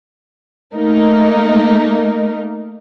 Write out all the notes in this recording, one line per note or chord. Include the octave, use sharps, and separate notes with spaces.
A3 A#3 D#4 A#4